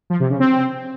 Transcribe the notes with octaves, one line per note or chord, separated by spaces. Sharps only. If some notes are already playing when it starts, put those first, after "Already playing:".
F3
C3
C#3
C4